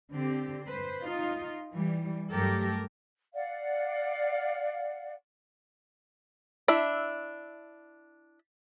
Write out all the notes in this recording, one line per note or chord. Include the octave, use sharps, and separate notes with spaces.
D3 C4 G4
B4 C5
D#4 F4
E3 G3
G2 F#3 A3 G4 A4 A#4
D5 F5 F#5
D4 E4 E5